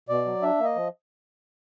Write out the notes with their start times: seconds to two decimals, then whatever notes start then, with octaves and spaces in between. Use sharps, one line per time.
0.09 B2 D5
0.26 F#3
0.42 D4 E5
0.60 A#3 D#5
0.76 F3